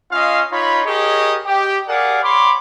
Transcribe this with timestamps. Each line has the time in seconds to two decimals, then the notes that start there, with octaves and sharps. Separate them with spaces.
0.11 C#4 F4 D#5 F5
0.51 D#4 F4 C#5 B5
0.85 G4 G#4 A#4 C#5 D#5
1.45 G4
1.88 G#4 A#4 D5 F5 F#5
2.23 C#5 B5 C6 D6